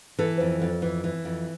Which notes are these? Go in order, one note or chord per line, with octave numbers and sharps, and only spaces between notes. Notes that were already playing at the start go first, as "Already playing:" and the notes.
E3 A4
F2
F2
E3
E3
F2